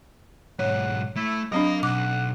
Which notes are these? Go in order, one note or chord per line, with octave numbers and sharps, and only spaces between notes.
B1 G#2 C#5 F#5
A3 E4
F#3 C4 D4 A#4 D#5 F5
B1 F#5 D6